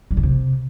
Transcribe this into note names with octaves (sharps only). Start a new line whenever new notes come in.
G3
C#3
C3